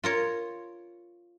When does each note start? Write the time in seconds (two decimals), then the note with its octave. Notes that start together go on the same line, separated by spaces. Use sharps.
0.04 F4 A#4 C#5